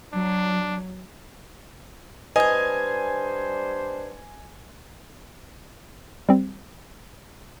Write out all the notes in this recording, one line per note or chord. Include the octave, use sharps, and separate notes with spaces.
F#3 D4
G3 D4 B4 C5 D#5 G#5 G#6
G3 C4